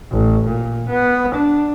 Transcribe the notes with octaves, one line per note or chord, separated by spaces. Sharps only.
A1
A#2
B3
D4